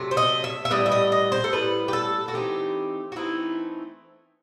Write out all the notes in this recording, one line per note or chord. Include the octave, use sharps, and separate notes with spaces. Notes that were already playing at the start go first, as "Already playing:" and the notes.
Already playing: C3 F#3 A3
C5
D#5
E5
E5
A2 G3 B3 D#5
E5
D#5
D#5
C5
A4
A2 G3 B3 B4
G4
A4
F#4
E3 A3 C4 D#4 G4
F#4
E3 A3 C4 D#4 E4